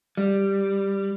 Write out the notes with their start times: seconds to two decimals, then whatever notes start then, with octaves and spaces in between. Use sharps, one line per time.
0.17 G3